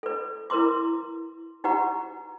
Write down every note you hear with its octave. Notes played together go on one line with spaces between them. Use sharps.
A4 B4
E4 A#4 B4 C6 D6
D#4 F#4 G4 B4 F#5 A#5